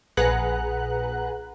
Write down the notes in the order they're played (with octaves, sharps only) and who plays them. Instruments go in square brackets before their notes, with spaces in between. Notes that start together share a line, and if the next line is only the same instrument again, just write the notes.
[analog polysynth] A#1 G#4 B4 F#5 A#5 F#6